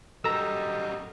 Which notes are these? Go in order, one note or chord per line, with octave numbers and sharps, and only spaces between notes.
F#2 G3 A4 D#5 A#5 E6